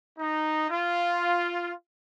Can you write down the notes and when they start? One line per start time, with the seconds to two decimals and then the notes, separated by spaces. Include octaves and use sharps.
0.18 D#4
0.70 F4